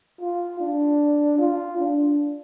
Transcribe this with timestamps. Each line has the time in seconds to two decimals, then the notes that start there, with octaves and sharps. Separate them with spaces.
0.20 F4
0.60 D4
1.38 F4
1.78 D4